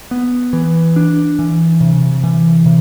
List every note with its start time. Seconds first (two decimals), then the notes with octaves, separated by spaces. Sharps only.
0.11 B3
0.53 E3
0.96 D4
1.39 E3
1.81 C3
2.24 E3
2.66 C3